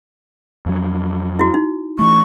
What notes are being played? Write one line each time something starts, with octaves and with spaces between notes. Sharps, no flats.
F2 F#3
E4 F#4
D#4
E3 A3 C#6